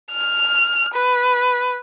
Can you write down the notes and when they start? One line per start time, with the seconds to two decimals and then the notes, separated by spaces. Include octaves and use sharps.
0.12 F6
0.94 B4